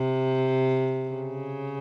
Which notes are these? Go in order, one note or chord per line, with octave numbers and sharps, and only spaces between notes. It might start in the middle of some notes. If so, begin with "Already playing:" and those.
Already playing: C3
C#3